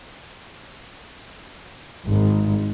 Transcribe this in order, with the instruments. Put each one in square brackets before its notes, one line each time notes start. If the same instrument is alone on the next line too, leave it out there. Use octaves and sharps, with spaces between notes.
[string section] G#1